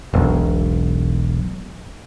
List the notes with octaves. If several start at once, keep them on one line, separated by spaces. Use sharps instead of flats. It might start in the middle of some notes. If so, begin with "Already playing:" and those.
E1 B1